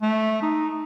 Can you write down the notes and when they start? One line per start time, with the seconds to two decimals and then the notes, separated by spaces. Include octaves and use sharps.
0.02 A3
0.42 D#4